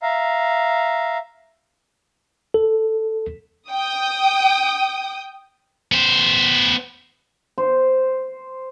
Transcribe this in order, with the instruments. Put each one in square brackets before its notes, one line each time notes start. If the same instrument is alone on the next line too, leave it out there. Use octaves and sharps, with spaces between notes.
[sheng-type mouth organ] E5 F5 A#5
[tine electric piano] A4
[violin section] G5 D#6
[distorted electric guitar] B3 C5
[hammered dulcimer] C5